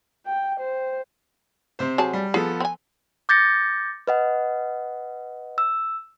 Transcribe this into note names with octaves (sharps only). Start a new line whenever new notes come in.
G5
C5
C3 C5
F#3 G#4 A5
G3
F3 B3 G#4 A4
C4 G#5
D6 G6 A6 A#6 C#7
B4 D#5 F#5
E6